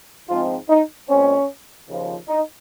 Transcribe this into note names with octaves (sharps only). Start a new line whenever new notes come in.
G#2 F3 G#3 C4 F4
D#4
A#2 G#3 C4 C#4
D#2 C#3 F3
D#4